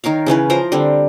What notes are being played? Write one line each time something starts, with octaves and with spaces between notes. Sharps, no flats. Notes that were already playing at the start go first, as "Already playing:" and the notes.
D#3 A#4 C#5 F5
C#3 E3 C#4 B4
F3 A#4 C5 A#5
D3 G3 C4